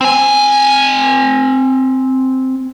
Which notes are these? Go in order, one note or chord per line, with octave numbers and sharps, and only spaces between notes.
C4 G#5